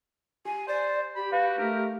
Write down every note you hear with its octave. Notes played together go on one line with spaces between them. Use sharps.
G4 G#5
C5 D5
G4 B5
F#4 B4 F5
A3 D#4 A#4